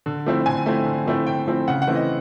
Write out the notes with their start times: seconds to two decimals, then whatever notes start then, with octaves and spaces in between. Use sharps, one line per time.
0.06 D3
0.26 F3 A3 C4 E4
0.46 D3 G#5
0.66 F3 A3 C4 E4
0.86 D3
1.06 F3 A3 C4 E4
1.27 D3 G5
1.47 F3 A3 C4 E4
1.68 C#3 F#5
1.82 F#5
1.87 E3 A3 C4 E4
1.95 D#5